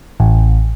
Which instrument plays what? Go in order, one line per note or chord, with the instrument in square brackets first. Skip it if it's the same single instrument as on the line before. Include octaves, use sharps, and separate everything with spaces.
[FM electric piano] A1